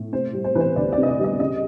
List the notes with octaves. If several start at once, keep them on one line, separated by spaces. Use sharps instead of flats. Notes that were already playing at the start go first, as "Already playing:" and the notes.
Already playing: A2
C3 C5
G3
C5
E3 B4 C5
D2 D5
C3 D5
D#5
D5
G3 D#5
C#3 D#5